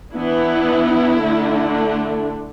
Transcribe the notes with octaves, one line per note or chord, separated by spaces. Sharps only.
E3 B3 D4 E4
D3 A3 D4